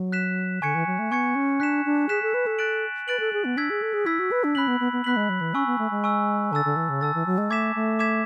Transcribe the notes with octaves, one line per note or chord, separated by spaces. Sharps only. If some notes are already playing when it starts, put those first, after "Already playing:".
Already playing: F#3
F#6 B6 E7
D3 G#5 C#6 G#6 C#7
E3
F#3
A3
B3 G#5 C#6 G#6 C#7
C#4
D4 F#6 B6 E7
D4
G#4 F#6 B6 E7
A4
B4
A4
F#6 A6 D7 F#7
B4 F#6 A6 D7 F#7
A4
G#4
B3
D4 E6 G#6 B6
G#4
A4
G#4
E4 E6 G#6 B6
F#4
B4
D4
C#4 B5 F#6 B6 F#7
B3
B3
B3
B3 B5 F#6 B6 F#7
G#3
F#3
E3
C#4 G#5 C#6 E6
B3
A3
G#3
G#5 C#6 E6
D3 A5 E6 A6
D3
E3
C#3
D3 A5 E6 A6
E3
F#3
G#3
A3 D6 G#6 B6 E7
A3
D6 G#6 B6 E7